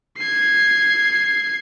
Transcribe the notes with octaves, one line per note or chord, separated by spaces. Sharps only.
G#6 C7